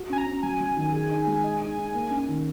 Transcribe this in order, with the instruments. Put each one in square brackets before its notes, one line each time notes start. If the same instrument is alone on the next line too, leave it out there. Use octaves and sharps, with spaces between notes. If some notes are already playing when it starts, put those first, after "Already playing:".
Already playing: [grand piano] F#4
[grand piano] C#4 [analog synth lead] G#5
[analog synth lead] A#5
[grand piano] C#4
[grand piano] F#3 [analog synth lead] G#5
[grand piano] F#3
D#3
G#4
D#4
G#3
D#5
D#4
D#4
A#3
C#4
D#3